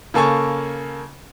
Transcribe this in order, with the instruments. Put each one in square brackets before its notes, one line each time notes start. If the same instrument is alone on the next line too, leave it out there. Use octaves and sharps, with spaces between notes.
[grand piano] C#3 A#3 A4 G#5 C#6